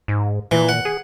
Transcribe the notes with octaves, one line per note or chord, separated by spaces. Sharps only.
G#2
A#2 E3
F#5
G#4